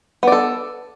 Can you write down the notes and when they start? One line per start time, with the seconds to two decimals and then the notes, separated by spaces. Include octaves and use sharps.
0.23 B3
0.28 D5
0.32 A4